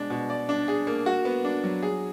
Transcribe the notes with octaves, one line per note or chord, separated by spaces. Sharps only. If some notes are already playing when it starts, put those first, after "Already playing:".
Already playing: B2 G#3 D4
B2
D5
D4
G#4
A#3
F#4
B3
D4
F#3
G#4